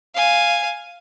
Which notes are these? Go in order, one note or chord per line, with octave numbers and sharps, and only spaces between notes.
F5 G#5